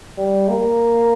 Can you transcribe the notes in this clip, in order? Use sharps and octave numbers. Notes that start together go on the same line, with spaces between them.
G3
A#3